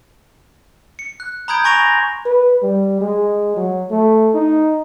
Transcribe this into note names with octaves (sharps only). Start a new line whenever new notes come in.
C#7
F#6
A#5 B5 D#6 G6 G#6 D7
G#5 C6 C#6 A#6 D7 F7
B4
G3
G#3
F#3
A3
D#4